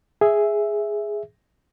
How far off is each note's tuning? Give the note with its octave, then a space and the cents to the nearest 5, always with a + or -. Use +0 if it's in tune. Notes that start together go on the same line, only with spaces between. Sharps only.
G#4 +0 E5 +0